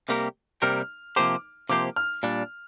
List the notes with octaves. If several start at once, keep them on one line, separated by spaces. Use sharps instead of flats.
C3 G3 A#3 G4 A#4
C3 G3 A#3 G4 A#4 F6
C3 F3 A#3 G4 C5 D6
C3 F3 A#3 G4 C5 D6
F6
A#2 G3 D4